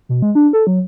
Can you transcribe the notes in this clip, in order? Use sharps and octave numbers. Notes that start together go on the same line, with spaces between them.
B2
G#3
D4
A4
F#3